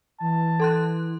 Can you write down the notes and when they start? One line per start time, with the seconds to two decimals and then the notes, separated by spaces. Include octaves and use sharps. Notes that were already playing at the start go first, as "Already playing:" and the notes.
0.20 E3 A5
0.60 A4 C6 F#6